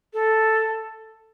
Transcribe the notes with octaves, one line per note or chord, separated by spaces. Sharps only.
A4